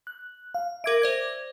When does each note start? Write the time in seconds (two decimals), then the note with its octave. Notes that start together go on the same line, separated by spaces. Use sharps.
0.07 F#6
0.54 F5
0.84 A#4 E5 D6 G#6 A#6 D7
1.02 C5 D5 G#6